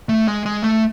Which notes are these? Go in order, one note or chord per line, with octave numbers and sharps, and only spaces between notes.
A3
G#3
G#3
A3